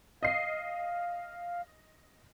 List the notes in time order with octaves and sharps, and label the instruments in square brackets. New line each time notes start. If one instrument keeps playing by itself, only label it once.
[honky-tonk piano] D#5 C7 [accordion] F5